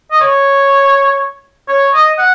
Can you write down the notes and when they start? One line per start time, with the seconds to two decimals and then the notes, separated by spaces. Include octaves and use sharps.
0.12 D#5
0.21 C#5
1.69 C#5
1.94 D#5
2.18 F#5